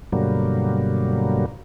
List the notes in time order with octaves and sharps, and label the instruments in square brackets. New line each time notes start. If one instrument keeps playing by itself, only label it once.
[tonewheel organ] G2 B2 D3 F#3 G3 A#3